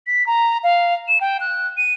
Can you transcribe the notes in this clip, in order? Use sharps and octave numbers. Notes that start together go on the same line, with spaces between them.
B6
A#5
F5
E7
G5
F#6
D#7